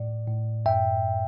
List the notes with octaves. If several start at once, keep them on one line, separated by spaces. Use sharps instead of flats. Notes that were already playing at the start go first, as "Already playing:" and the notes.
Already playing: A2 D5
A2
F#2 E5 G5